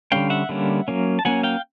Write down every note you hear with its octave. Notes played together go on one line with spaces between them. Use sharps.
D3 G3 A#3 C#4 F5 G5
E5 F#5
D3 G3 A#3 C#4
F#3 A#3 C#4
A5
F#3 A#3 C#4 F#5 G#5
F5 G5